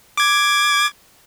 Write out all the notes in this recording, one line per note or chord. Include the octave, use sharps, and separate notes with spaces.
D6 G#6